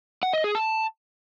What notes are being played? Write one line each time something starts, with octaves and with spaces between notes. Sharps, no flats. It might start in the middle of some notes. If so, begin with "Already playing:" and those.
F#5
D#5
G#4
A5